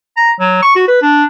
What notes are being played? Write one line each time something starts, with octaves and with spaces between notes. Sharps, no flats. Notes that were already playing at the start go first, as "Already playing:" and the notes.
A#5
F#3
C#6
F#4
B4
D4